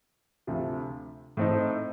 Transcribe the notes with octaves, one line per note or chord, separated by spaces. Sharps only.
D2 C3 F3
A2 A3 C4 D#4